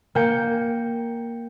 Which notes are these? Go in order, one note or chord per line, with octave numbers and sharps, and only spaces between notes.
A#3 G5 C#7